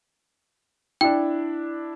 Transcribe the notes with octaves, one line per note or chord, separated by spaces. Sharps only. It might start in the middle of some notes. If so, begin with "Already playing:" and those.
D4 E4 G5